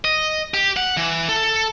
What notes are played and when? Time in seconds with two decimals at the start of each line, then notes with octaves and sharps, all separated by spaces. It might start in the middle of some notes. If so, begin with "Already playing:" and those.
0.05 D#5
0.54 G4
0.77 F#5
0.97 E3
1.29 A4